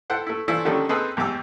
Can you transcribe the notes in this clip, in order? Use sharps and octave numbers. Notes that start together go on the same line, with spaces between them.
E4 A4 C5 F#5 G5
A3 E4
E3 A3 D4 E4 F4 C5
D3 D#3 F3 G3 A3 C#4
C4 D#4 G#4 A4 B4 C5
E2 G#2 G4 D6 E6